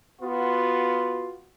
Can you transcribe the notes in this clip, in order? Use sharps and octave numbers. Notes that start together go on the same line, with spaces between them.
B3 F4 F#4